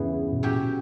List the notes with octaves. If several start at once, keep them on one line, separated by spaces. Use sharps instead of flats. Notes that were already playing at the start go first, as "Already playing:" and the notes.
Already playing: E2 G2 C#3 E3 B3
B2
A#2 F#3 C#4 G4
A#2